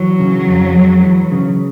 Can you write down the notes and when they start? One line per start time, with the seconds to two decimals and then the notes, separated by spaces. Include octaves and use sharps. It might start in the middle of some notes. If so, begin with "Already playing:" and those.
Already playing: E3 F#3
0.19 C#3
0.47 F2
0.75 G#3
1.03 E3
1.31 C#3